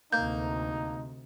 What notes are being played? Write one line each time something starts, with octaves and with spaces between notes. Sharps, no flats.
D2 C3 A#3 D#4 G6